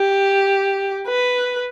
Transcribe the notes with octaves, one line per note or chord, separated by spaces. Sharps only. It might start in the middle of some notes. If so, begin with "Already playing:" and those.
Already playing: G4
B4